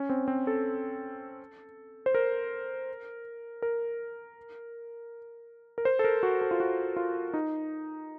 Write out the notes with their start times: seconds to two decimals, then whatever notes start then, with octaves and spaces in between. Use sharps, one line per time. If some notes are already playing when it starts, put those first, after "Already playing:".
Already playing: C#4
0.10 C4
0.28 C4
0.47 A4
2.06 C5
2.15 A#4
3.62 A#4
5.78 A#4
5.85 C5
5.99 A4
6.04 A#4
6.23 F#4
6.41 A4
6.51 F4
6.60 F#4
6.96 F4
7.34 D#4